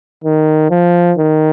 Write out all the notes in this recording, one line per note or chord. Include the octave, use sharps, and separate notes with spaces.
D#3
F3
D#3